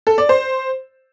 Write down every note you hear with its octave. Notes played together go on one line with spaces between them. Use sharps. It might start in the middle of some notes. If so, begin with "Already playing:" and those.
A4
D5
C5